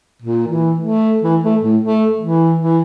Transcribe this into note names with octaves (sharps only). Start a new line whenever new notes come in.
A#2
E3
A3
E3
A3
A2
A3
E3
E3